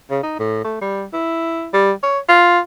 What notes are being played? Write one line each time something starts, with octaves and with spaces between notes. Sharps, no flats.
C#3
D#4
A2
A3
G3
E4
G3
C#5
F4